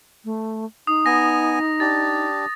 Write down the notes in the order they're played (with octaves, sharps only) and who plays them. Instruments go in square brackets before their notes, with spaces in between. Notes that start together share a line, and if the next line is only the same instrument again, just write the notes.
[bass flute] A3
[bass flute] D#4 [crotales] D#6
[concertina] B3 G#5 [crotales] A#6
[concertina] D4 G4 [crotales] A6